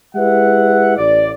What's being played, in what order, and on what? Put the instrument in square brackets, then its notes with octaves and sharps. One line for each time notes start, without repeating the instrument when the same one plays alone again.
[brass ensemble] G#3 E4 G4 B4 E5 F#5
A1 D5